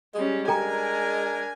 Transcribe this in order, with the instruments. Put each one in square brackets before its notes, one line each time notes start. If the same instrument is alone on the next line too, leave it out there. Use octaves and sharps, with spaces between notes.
[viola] G3 C#4 [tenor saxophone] G#3
[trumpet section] D4 A#4 [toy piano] A4 G5 A#5 [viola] G#5